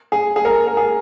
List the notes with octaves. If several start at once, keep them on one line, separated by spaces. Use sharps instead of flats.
G#4
G#4
A#4
A#4
G#4